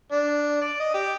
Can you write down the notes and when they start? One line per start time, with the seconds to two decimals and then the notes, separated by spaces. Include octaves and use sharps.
0.12 D4
0.61 D5
0.80 D#5
0.94 G4